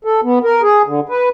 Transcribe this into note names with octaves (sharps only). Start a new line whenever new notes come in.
A4
B3
A#4
G#4
D3
B4